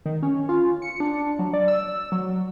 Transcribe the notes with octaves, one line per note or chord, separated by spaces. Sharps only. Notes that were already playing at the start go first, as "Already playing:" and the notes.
D#3
C#4
F4
C#7
D4
F#3
D5
E6
F#3